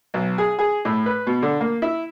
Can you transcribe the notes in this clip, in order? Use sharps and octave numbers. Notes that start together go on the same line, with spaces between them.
B1
G#4
G#4
A2
B4
B2
D3
A#3
E4